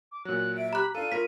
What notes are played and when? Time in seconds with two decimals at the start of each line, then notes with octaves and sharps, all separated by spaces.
0.12 D6
0.25 A#2 F#3 F#6
0.57 E5 D7
0.73 G4 A#5 B5 F#6
0.95 D4 F4 A4 F5 D#7
1.12 A2 E4 F4 A#4 B6